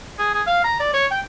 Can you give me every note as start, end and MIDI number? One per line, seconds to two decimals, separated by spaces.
0.19 0.30 68
0.34 0.42 68
0.47 0.61 77
0.64 0.80 82
0.80 0.94 74
0.94 1.06 73
1.11 1.20 79